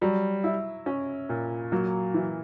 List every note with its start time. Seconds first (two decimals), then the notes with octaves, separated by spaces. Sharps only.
0.01 F#3 G3
0.44 E4
0.86 C#4
1.29 A#2
1.72 F#3 A#3
2.14 E3